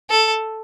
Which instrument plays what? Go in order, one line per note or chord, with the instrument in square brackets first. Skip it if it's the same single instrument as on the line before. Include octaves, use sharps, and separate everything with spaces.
[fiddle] A4